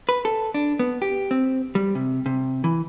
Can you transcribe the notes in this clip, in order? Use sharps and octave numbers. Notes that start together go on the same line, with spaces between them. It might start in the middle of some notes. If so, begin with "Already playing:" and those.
B4
A4
D4
B3
G4
C4
G3
C3
C3
E3